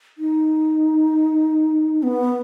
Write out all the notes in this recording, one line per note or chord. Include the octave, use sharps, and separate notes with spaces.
D#4
B3